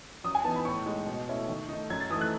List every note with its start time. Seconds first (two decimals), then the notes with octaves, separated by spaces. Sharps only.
0.24 F#2 D#6
0.35 G#5
0.44 E3 B3 D#4 A5
0.56 B5
0.65 A2 C#6
0.86 G#3 D#4
1.07 B2
1.28 A3 C#4 E4
1.48 D#3
1.69 A3 D#4
1.90 F#2 G#6
2.00 A6
2.10 E3 A3 D#4 D#6
2.21 F#6